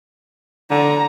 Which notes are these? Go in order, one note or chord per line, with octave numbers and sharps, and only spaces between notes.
D3 A#5